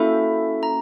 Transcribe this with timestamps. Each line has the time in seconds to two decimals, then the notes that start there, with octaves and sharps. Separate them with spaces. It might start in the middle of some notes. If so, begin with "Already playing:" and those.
Already playing: A#3 C#4 E4 F#4 A4 E5
0.63 A#5